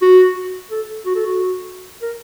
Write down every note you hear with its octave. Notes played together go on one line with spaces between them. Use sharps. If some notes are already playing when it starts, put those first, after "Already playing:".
F#4
A4
F#4
A4
F#4
A#4